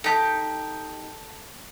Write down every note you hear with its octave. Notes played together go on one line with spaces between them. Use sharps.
D#4 G4 A4 A5